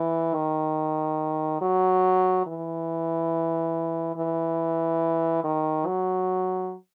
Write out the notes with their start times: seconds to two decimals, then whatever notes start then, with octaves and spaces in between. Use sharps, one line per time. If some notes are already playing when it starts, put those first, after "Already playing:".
Already playing: E3
0.34 D#3
1.61 F#3
2.47 E3
4.16 E3
5.44 D#3
5.86 F#3